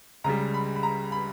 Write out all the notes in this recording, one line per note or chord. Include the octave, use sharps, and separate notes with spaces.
C#2 C#3 G3 A#5
B5
B5
A#5
B5